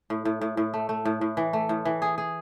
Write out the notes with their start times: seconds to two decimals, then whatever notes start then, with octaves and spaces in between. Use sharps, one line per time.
0.10 A2
0.25 A2
0.41 A2
0.57 A2
0.74 A3
0.89 A3
1.05 A2
1.21 A2
1.37 E3
1.53 A3
1.69 A2
1.85 E3
2.02 G#4
2.18 G#4